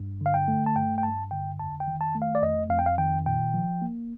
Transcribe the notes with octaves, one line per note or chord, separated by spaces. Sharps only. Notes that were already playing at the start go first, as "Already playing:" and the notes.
Already playing: G2
D3 F5
G5
A3
A5
G2 G5
G5
G2 A5
D3 G5
F2 A5
G5
D#3
A5
A3
F5
D5
F2 D#5
F2 F5
G5
F5
D#3 G5
A#2 G5
F3
A#3